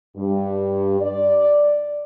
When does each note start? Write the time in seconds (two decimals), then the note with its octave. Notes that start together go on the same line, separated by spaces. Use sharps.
0.17 G2
1.01 D5